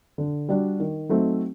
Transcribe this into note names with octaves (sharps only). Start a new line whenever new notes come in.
D3
G3 D4 F#4
D#3
F#3 A3 C4 D#4